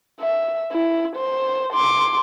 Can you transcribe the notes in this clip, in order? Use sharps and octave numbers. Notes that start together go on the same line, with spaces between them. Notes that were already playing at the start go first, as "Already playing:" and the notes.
E5
E4
C5
C6 D6